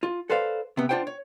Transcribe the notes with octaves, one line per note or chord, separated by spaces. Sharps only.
F4
A4 B4 C5 D5 F5
C3 B3
D4 F4 C5 F#5 G5
C#5